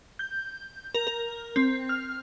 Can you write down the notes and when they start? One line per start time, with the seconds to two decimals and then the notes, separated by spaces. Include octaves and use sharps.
0.19 G6
0.94 A#4
1.07 A#4
1.56 C4
1.89 F6